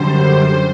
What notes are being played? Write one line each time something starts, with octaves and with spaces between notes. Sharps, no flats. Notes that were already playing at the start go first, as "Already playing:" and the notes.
Already playing: F#2 D3 G3 C5